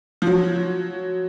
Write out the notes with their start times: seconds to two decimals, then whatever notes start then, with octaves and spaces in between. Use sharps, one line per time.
0.22 F3
0.27 F#3